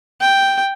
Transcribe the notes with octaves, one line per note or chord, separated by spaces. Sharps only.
G5